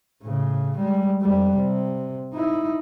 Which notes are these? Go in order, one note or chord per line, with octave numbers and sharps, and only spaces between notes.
A2 C#3
G3 G#3
F2 G3
C3
D#4 E4